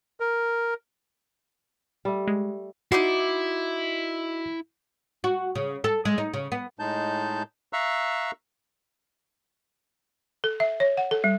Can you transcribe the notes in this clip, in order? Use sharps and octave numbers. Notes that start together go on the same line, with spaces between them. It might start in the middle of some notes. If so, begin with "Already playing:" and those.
A#4
G3 A3
G#3
D#4 E4 F#4 D5 C6
F#4
C#3
A4
G#3
D#4
C#3
B3
A2 G#3 D#4 A5 G6
E5 F5 A#5 C#6 E6 F#6
A4
E5
C#5
F#5
A4
G3